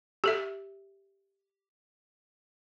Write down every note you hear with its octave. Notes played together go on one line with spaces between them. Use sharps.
G4 A4 E5